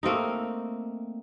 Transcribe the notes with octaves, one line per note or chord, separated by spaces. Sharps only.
A3 A#3 C4 D#4